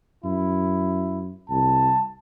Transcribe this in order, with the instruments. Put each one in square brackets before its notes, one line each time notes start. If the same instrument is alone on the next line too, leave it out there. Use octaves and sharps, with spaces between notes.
[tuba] F#2 [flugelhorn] E4
[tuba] C2 [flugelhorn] A5